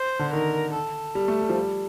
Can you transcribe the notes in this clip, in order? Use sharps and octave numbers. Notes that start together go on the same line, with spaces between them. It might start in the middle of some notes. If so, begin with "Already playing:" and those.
Already playing: C5
D3
D#3 A#4
A4
G3
A3
G3
F3
G3